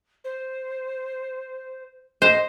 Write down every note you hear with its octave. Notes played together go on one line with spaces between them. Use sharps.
C5
C5 D#5